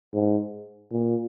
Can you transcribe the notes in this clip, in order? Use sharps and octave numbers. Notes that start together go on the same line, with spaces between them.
G#2
A#2